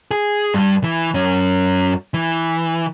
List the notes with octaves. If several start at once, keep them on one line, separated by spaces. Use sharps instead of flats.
G#4
G2 G3
E3
F#2 C#4
E3